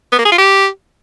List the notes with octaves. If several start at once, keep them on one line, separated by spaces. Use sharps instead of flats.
B3
A#3
G#4
F4
G4